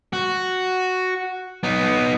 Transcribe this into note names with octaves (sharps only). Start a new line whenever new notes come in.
F#4
B3 D#4